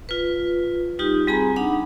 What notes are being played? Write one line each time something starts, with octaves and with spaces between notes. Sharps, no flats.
F4 B4
G3 D#4 F4 G4
G3 C4 G#4 G#5 A#5 B5
D4 D#4 F#5 B5